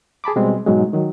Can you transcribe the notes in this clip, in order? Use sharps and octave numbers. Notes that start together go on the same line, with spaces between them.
G#4 A5 B5 D6
B2 G3 G#3 C4
G#2 B2 F#3 G#3
D#3 F#3